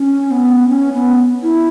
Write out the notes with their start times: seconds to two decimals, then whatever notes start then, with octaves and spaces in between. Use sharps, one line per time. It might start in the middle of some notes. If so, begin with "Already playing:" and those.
Already playing: C#4
0.31 B3
0.68 C#4
0.93 B3
1.43 E4